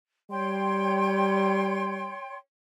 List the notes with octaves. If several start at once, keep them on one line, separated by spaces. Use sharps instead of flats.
G3 C#5 G5 C6